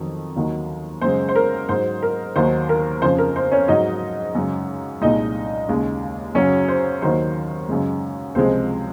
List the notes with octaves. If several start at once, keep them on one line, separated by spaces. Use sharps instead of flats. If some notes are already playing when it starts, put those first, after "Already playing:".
Already playing: F2 D#3 F#3
D#2 D#3 F#3
F#2 C#3 G#3 C5
C5
A#4
G#2 F#3 C5
A#4
D#2 D#3 F#3 C5
A#4
F2 C#3 F3 C5
A#4
C5
C#4 C#5
G#2 F#3 D#4 D#5
F#2 C#3 G#3
C2 A#2 G#3 D#4 D#5
D#2 C#3 G#3
F#2 C#3 F#3 C#4 C#5
C5
D#2 D#3 F#3 C5
F#2 C#3 G#3
C#2 C3 F3 G#3 C5